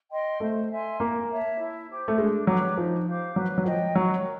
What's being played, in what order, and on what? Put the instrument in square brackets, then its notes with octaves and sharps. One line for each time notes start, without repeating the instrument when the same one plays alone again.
[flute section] D#5 G5 C6
[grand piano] A3 [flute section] C5
[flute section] E5 G#5 C6
[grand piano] A#3 [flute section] A#4
[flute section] C#5 E5 A5
E4
G4 C5
[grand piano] A3
[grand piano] G#3 [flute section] D4
[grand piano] F#3 [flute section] G4 B4
[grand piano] F3 [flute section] D#4
[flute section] G4 C5 F5
[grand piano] F#3 [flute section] B4
[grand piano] F#3
[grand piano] F3 [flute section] D#5 G5
[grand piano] F#3 [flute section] F#4
[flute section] A#4